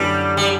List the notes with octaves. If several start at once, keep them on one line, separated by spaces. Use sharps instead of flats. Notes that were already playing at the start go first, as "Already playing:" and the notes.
Already playing: F#2 D3 G3 A3 E4 B4
G3